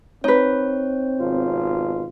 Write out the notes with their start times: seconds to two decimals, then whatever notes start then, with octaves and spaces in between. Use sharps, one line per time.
0.24 C4 D#4 B4 C#5
1.20 G#1 B2 F4